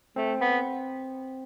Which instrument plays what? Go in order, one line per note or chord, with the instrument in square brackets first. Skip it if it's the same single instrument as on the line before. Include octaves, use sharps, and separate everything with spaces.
[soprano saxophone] A3 [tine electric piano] C4
[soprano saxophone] B3